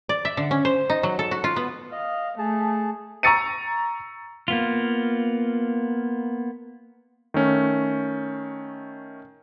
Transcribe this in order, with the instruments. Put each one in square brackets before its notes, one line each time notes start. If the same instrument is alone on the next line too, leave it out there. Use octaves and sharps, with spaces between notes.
[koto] D5
E5
D3
C#4
C5
D#4
F#3
A4
F#4
F4
B3
[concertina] D#5 [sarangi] F5
[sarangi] A3 [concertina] G#4 A5
[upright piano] A#5 C#6 E6 A6 C#7 D#7
[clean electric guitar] A#3 B3 F4
[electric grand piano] D#3 A3 C#4